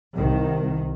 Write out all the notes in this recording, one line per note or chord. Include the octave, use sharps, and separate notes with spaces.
C2 D#3